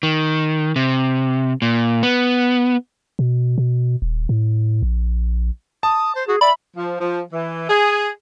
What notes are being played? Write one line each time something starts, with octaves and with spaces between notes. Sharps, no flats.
D#3
C3
A#2
B3
B2
B2
D#1
A2
A#1
A5 D#6
C5
F#4 G#4
D5 E5 B5
F3
F3
E3
G#4